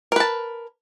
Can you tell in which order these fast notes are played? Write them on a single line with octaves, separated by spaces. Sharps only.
A#4 B4 A5